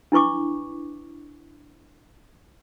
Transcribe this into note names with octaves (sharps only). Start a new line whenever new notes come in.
D4 E4 B4 C#6 D6